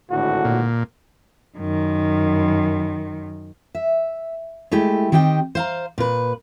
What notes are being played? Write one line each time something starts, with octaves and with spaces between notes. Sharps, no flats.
G#1 A2 D3 F#4
A#2
F#2 D#3
E5
G#3 A3 E4 G4
D#3 C4 G4 D#5 G5
C5 F5 A#5
A#2 B4